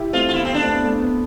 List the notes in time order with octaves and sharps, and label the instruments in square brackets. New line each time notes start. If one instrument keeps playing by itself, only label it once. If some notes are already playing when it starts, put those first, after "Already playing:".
Already playing: [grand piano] E4 G4
[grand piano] A3 C4 [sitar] F4
[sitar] F4
[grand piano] B3 [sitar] E4
[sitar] C4
D4
[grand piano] A3
B3
A3
B3